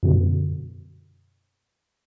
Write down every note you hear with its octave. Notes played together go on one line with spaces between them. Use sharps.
F#2 B2 D3